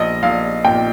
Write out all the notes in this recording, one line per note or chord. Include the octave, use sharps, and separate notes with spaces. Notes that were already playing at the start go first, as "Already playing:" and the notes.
Already playing: A#1 D#5
A#1 F5
A#2 G5